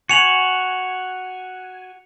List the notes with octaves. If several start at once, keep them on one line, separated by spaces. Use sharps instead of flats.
F#4 G#5 C#7 F7 F#7